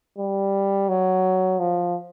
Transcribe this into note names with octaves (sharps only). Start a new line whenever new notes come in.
G3
F#3
F3